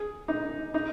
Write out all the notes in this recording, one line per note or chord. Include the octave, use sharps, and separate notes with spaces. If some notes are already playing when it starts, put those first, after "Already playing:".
Already playing: G#4
D#4
D#4